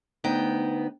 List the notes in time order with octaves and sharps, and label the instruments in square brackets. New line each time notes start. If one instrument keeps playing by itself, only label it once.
[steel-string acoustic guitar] D2 B3 D#4 G5